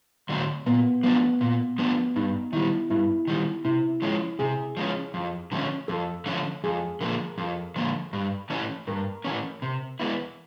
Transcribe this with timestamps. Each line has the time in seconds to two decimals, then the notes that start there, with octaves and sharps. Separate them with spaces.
0.29 D3 F#3 A3 C4
0.66 A#2 B3
1.03 F3 A3 B3 D4
1.41 A#2
1.78 F3 A3 B3 D4
2.16 G2 D#4
2.52 D#3 G3 E4
2.90 G2 E4
3.27 D#3 G3
3.65 C3 E4
4.02 F3 G#3 C#4
4.39 C3 G#4
4.77 F3 G#3 C#4
5.14 F2
5.52 D3 F3 A3 C#4
5.88 F2 A4
6.26 D3 F3 A3 C#4
6.64 F2 G#4
7.01 D3 F3 A#3 A#4
7.38 F2 A4
7.76 D3 F3 A#3
8.13 G2
8.50 E3 A3 C#4
8.87 G2 A#4
9.25 E3 A3 C#4
9.62 C3
10.00 E3 G#3 B3 E4